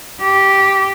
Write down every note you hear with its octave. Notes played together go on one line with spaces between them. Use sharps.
G4